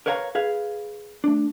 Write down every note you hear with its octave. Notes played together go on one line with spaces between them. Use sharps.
A#4 B4 C#5 F5 G#5 A#5
G#4 B4 F5
A3 D4